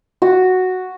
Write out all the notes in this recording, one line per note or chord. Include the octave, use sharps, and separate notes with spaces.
F#4